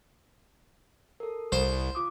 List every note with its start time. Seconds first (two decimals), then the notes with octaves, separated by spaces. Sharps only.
1.20 A4 A#4
1.52 C2 C5
1.95 F4 D6 D#6